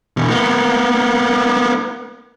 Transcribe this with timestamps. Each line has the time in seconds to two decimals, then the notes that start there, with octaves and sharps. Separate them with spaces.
0.17 E2 B2
0.30 A#3 B3